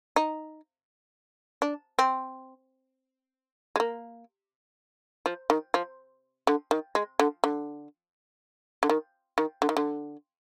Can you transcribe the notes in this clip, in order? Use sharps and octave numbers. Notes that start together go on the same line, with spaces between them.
D#4
D4
C4
G#3
A#3
F3
D#3
F3
D3
D#3
G#3
D3
D3
D3
D#3
D#3
D3
D#3
D3